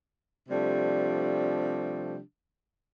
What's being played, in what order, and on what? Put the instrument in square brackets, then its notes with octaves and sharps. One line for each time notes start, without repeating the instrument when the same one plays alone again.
[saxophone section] C3 F3 G3 A3 D4